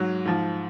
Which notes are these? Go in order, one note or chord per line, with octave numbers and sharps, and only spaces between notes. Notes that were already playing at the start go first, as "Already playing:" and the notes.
Already playing: G#2 F#3
G#2 F3